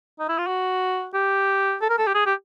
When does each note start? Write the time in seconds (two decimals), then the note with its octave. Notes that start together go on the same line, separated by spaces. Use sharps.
0.19 D#4
0.28 E4
0.38 F4
0.47 F#4
1.14 G4
1.81 A4
1.90 A#4
1.98 A4
2.07 G4
2.15 G#4
2.26 G4